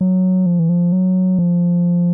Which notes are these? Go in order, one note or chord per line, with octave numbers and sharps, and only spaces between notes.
F#3
F3
E3
F3
F#3
F3